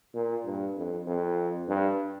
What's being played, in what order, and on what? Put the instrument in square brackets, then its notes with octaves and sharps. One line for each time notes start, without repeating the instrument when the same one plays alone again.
[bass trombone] A#2
G2
F2
F2
G2